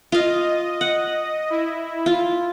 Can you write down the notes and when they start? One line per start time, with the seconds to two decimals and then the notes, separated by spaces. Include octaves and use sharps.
0.12 F4 D#5 F5
0.81 F#5
1.50 E4
2.06 F4